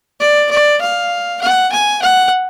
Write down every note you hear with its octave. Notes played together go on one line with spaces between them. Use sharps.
D5
D5
F5
F#5
G#5
F#5